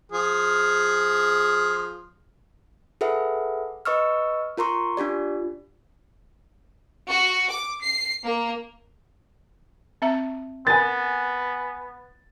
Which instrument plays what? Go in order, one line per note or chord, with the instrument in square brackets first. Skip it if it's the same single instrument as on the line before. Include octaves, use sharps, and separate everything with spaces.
[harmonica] F3 G#4 F6
[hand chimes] G#4 A4 B4 E5 F#5
B4 D#5 C#6 E6 F6
F4 A#4 A#5 C6 C#6
D4 F4 G4 D5
[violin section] F#4
D6
C7
A#3
[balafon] C4 E5 A#5
[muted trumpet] B3 [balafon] A#4 [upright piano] G#5 A6